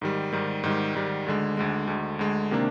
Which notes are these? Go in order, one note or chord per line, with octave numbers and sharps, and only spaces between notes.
G#2 D#3 G3
G#2 D#3 G3
G#2 D#3 G3
G#2 D#3 G3
D2 D3 G#3
D2 D3 G#3
D2 D3 G#3
D2 D3 G#3
C3 D#3 A#3 D4